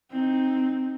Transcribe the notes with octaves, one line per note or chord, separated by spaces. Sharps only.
C4 D#4